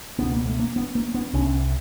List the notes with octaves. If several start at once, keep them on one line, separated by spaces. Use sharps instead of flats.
C#2 B2 B3
A#3
A3
A#3
B3
A#3
B3
C2 C3 C#4